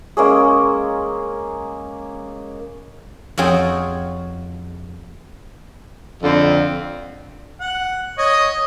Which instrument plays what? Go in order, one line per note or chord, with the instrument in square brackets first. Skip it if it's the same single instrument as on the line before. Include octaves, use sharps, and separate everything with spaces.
[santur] G#3 A#3 C#4 G#4
[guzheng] F2 F4 F#4 G#4 C#5 G5
[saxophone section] F2 D3 C4
[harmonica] F#5
C#5 D#5